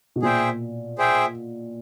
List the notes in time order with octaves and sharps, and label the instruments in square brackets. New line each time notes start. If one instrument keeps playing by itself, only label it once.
[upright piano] B2
[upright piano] A#2 [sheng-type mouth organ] G#4 C5 E5 G5
[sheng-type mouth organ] G#4 C5 E5 G5